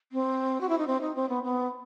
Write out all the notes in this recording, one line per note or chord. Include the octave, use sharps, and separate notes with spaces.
C4
F#4
E4
D#4
C4
D#4
C4
B3
B3